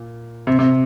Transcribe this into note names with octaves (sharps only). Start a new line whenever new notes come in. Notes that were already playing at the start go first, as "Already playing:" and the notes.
Already playing: A#2
C3
C3